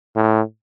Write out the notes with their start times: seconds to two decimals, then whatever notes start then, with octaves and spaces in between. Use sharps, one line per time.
0.16 A2